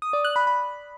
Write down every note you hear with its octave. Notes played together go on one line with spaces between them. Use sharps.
D#6
D5
F#6
B5
B5